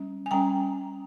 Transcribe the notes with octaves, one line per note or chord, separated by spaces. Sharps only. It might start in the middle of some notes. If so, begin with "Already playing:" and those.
Already playing: G3 C#4
G#5
G3 C#4 G5 A#5